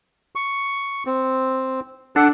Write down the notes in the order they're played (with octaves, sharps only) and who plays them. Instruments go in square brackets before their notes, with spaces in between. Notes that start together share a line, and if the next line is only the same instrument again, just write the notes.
[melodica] C#6
C4
[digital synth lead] D4 [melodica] A4 F#5